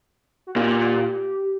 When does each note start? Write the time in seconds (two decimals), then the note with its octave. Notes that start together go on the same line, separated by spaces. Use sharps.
0.47 F#4
0.56 A#2 G4